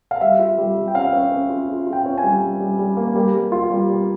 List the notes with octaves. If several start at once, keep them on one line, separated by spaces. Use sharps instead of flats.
F5
G3 E5
F4
G3
G3
G5
C#4 F5
C#4
C#4
F4
F4
F4
G5
C#4
G#5
G3
G3
G3
G3
A#3
G3
G3
F4
G3
G3